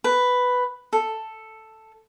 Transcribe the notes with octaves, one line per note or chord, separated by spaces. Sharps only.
B4
A4